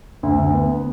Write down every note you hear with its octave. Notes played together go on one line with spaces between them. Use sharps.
D2
D2
B3